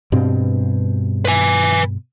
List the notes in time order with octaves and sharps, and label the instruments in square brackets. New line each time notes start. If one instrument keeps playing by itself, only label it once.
[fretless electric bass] G2 B2 C4
[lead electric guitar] B4 G#5